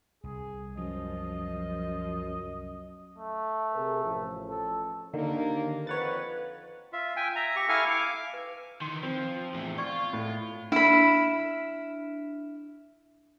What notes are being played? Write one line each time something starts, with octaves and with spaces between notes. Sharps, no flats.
C2 G#4
F#2 F3 D#5
A3
C3 G#4 A#4
A1 F3
A4
D#2 D3 D#3 A#3
F2 F4 B4 C#5 F#5 A6
F4 E5
G5 G#5
E5 A#5
G4 C#6
E4 A4 F5 G#5 C#6 F6
F5 D6
B4
D#3 E3 C6
F3 C4
E2 A2
F4 D5 C#6
A2
D4 E4 B5 F6 E7